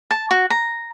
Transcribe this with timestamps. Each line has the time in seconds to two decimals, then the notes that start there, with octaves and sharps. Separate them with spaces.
0.11 A5
0.31 F#4
0.50 A#5